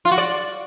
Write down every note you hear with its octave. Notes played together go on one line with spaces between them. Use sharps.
F4
F#4
D5